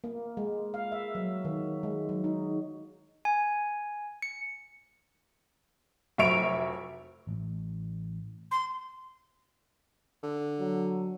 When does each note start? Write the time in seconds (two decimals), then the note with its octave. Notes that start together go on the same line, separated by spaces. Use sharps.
0.04 A#3
0.37 G#3
0.74 F5
0.92 E5
1.15 F#3
1.45 D#3
1.83 G#3
2.09 F#3
2.24 D#4
3.25 G#5
4.22 C#7
6.18 F1 F#3 E5 C#6 D7 F7
7.27 A1 A2
8.51 C6
10.23 D3
10.60 F#3